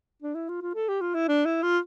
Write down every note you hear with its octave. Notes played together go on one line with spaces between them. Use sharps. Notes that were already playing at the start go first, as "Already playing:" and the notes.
D4
E4
F4
F4
A4
G4
F4
E4
D4
E4
F4